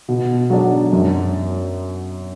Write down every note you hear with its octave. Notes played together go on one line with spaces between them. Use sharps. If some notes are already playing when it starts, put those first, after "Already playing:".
B2
F#3 D4
F#2